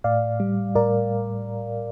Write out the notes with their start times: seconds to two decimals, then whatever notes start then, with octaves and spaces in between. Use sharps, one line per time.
0.04 A2 D5 F5
0.40 G3
0.75 A2 A#4 D5